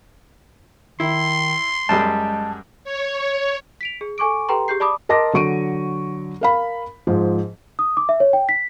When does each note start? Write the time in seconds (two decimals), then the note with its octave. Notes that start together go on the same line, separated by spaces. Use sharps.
1.00 D#3 E4 C6
1.89 F#2 G3 G#3 G#4 A5
2.84 C#5
3.81 B6 D7 F7
4.01 G#4
4.18 A4 G#5 C#6 D6 D7
4.49 G4 A4 B4 G5 A#5 C6
4.68 G4 G#4 G6 C7
4.80 D5 A5 B5 D6 D#6
5.09 A#4 D#5 A5 C6 D6 A#6
5.33 D3 F#3 C#6 D7 D#7
6.41 A#4 F5 B5
7.07 G#2 F3
7.79 D#6
7.97 D6
8.09 E5
8.20 C#5
8.33 G5
8.49 B6